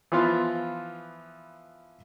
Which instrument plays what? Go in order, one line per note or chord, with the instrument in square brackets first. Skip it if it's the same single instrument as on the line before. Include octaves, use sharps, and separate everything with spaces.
[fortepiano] E3 F3 B3 F4 C6